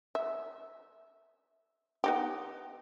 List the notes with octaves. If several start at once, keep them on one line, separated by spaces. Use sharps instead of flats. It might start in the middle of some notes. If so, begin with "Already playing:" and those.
E5
B3 D#4 G4